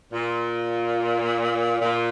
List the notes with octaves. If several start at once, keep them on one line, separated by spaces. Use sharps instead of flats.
A#2
A#2